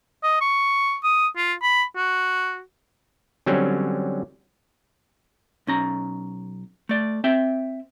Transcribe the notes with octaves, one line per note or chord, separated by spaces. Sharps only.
D#5
C#6
D#6
F4
B5
F#4
D3 F#3 G3 C4 C#4
B1 C#4 A#5
A3 D5
C4 E5 G5